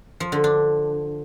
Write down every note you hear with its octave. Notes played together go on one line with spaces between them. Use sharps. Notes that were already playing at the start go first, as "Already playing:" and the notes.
F3
D3
D4